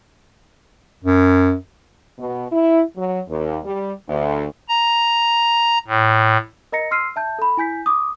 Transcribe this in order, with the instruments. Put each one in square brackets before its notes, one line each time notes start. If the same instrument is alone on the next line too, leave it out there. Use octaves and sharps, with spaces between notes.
[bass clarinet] F#2
[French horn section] B2
E4
F#3
D#2
G3
D2
[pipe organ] A#5
A2
[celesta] A#4 D#5 A#5 A#6 C#7
C6 E6 F6 C7 D#7
E5 A5 G6
A4 B5
E4 G#5 G6 B6
D6 D#6